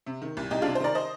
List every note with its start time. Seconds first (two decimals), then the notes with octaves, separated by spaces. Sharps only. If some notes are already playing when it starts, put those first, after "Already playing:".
0.07 C3
0.22 D#3
0.37 C2
0.50 C2 D#4 G4
0.62 C3 D4 F4
0.75 C5
0.80 D#3 A#4 D5
0.95 C5 D#5